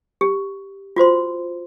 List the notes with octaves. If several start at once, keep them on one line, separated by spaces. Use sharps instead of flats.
G4
F4 F#4 C5 C6